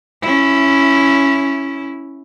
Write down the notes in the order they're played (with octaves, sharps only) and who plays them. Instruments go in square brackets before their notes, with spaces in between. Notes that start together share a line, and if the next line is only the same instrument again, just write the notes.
[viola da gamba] C#4 E4